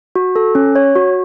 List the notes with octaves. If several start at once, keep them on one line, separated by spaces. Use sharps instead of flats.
F#4
A4
C#4
C#5
F#4